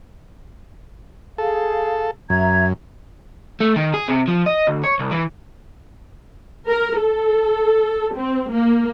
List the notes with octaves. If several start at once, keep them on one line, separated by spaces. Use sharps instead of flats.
G#4 A4 F5
F#2 E5 A#5 G#6
A3
D#3
G#4
C3
F3
D#5
D2
C#5
C2
E3
A#4
A4
C4
A#3